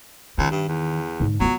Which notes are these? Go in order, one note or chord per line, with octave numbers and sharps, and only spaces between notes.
C#2 D#3
G2
E2
G#2 D3
F#3 B3 F4